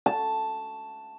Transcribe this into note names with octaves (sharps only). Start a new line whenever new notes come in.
A5